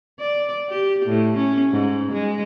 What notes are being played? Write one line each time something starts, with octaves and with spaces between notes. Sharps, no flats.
D5
G4
A2
C#4
G#2
G#3